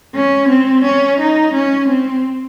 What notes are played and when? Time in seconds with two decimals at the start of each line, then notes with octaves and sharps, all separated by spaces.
0.15 C#4
0.49 C4
0.84 C#4
1.20 D#4
1.54 C#4
1.88 C4